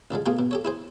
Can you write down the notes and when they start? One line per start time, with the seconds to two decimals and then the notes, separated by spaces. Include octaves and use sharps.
0.11 A1 D3 F3 G#3
0.26 B2 A3 A#3 F4 G4 G#4
0.39 B2
0.51 G4 A4 C#5
0.65 E4 G#4 C5